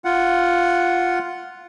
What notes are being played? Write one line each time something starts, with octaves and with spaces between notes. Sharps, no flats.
F4 F#5